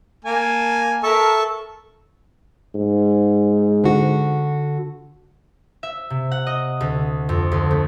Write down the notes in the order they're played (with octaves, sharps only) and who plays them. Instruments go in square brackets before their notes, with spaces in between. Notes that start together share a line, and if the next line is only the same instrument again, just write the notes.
[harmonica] A#3 G#5 A5
[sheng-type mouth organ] A4 A5 C#6 [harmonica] A#4 E5
[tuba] G#2
[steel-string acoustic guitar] D3 F#4
[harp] E5
C3
F#5
D#5
D2
F2
D2
A3